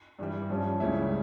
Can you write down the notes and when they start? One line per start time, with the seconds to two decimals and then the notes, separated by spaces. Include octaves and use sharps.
0.19 G2 E3 G3
0.50 G2 F3 C#4
0.80 C#2 C#3 G3 C#4 E4